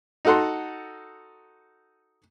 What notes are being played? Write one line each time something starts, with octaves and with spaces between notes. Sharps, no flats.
D#4 F#4 A4 F#5 C6